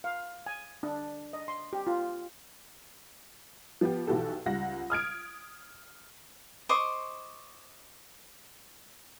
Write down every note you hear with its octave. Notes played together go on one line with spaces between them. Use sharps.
F5
G#5
D4
D#5
C6
G4
F4
F3 B3 G4
B1 E3 F#4 G4 A4
C#2 G3 F#5 A#6
D#6 F6 G#6 D7
C5 D#5 C#6 D6